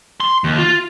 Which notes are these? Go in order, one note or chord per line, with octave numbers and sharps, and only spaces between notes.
C6
D#2
F4